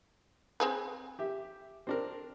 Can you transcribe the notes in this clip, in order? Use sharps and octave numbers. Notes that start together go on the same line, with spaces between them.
C4 G#4 B4
G4 E5
C4 D4 A#4